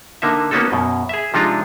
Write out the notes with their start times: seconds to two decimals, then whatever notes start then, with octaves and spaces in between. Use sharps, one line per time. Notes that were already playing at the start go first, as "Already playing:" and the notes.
0.22 D3 A#3 D#4 E5
0.51 A#3 B3 C#4 D#4 F#4 A4
0.72 F#2 B2
1.09 G#4 E5
1.34 C3 F3 G#3 D4 D#4 F4